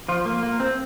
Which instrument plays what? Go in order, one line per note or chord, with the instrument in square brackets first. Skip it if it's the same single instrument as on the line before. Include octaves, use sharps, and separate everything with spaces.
[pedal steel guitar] F3 F4
A#3
A#3
C4